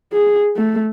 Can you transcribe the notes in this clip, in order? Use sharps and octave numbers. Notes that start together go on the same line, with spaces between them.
G#4
A3